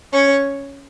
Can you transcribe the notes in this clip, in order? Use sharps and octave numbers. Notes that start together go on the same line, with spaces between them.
C#4 C#5